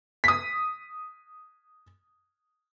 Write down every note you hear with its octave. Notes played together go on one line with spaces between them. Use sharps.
D#6 B6